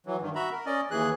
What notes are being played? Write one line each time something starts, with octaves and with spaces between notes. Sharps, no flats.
E3 F#3
G2 D#3
F#4 E5 A#5 B5
A#4
C#4 D5 D#5
D#2 E3 G#4 F#6